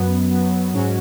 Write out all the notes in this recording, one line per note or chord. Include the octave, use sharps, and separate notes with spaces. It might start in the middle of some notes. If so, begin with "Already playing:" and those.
Already playing: F#2 F#3 B3
F#2 F#3 B3
G#2 F#3 C#4 F#4